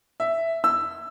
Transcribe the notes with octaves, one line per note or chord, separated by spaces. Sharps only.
E5
E6